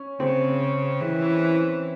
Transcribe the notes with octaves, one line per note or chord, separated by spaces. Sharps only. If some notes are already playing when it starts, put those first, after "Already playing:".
Already playing: C#4
C#3 C4
E3